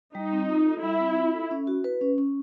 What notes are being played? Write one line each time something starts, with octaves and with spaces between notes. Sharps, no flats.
G3 D#4
C4
F4
A4
G3 E4
C4
F4
A4
C#4
F#4
B4
C#4
C#4